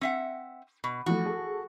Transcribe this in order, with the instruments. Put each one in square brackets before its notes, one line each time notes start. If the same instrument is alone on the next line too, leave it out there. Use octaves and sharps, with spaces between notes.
[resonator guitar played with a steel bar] C4 E5 F#5
B2
[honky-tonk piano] E3 F3 A3 [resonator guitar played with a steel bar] F#4
[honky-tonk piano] G#4 A4